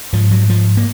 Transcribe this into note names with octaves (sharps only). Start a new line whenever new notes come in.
G#2 F3
F#3
F3
A#3